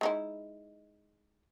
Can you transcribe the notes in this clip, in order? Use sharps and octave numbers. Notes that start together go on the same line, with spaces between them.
G#3 D#4 E4